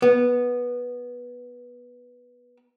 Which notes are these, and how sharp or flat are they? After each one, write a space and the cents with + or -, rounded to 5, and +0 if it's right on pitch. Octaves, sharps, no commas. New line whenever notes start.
B3 -10